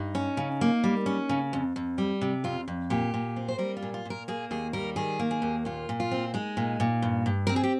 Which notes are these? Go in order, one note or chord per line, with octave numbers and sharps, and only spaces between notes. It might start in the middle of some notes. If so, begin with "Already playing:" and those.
Already playing: G2 D#4
C#4
C#3
A#3
G3
C#4
C#3
F2
F2
G3
C3
F2 F4
F2
A#2 G4
A#2
C4
C5
G3 A#4
F4
A#2
F4
A#2 A#4
A#3 G#4
D#2 G#4
G3 A#4
D#3 G#4
A#3
G#4
D#2
A#2 F4
A#2
F4
C4
G#3 D#4
A#2
A#2
G2
G2
C4 A#4
G#4
G4